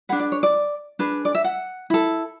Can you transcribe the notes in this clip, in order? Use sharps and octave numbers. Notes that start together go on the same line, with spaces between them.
D4 G#4 B4 F#5
D5
C#5
D5
D4 G#4 B4
D5
E5
F#5
E4 A4